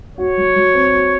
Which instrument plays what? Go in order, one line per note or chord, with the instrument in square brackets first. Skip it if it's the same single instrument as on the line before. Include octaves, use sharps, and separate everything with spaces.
[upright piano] F#4 [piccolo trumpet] C#5
[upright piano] F#3
F#3
C4
F#4